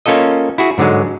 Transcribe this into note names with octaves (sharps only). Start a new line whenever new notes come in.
A#3 C#4 F4 A4 D#5
E4 F#4 G#4
G#2 D3 F#3 G#3